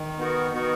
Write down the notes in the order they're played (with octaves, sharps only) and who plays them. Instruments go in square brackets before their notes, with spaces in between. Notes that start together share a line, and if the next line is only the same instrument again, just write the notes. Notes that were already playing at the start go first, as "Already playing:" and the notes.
Already playing: [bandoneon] D#3
[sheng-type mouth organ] B3 D#4 F#4 A#4
[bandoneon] D#3 [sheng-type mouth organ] B3 D#4 F#4 A#4